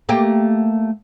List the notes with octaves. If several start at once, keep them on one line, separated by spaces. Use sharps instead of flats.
A3 A#3 G4